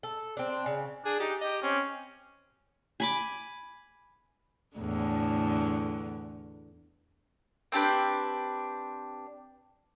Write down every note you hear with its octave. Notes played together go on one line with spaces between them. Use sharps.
A4
C4 D4
C#3
D4 G#4
D#4 G4
G4 D#5
C4 C#4
G#5 B5 D6
E2 A2 D3
C4 D4 G4 B4